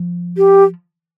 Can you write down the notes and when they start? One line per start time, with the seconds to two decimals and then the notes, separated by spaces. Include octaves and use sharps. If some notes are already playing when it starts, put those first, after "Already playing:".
Already playing: F3
0.37 G4